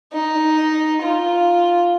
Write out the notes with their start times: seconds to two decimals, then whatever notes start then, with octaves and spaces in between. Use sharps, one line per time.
0.13 D#4
1.02 F4